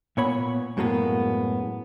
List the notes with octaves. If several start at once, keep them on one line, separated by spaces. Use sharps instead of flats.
A#2 B3 C#5 B5
F#2 A2 G#3 A#3 B3